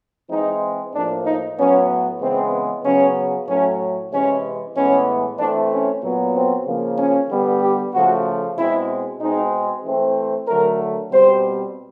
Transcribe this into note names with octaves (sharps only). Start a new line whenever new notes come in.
E3 G#3 C4 D#4
A2 F3 A#3 D4
D#4
A2 F#3 B3 C#4
C#3 E3 G#3 B3 C4
C#3 F#3 B3 C#4
A2 F#3 A3 C#4
C3 E3 G#3 C#4
A2 E3 G#3 B3 C#4
E3 A3 C4 D4
C#4
A#2 F#3 B3
C4
C#3 F3 A#3
C#4
D3 G3 B3
G4
C#3 F3 A3 F#4
B2 G#3 C4 E4
B2 G#3 C4 D#4
E3 A3 C4
D3 F#3 A3 A#4
B2 G3 C4 C5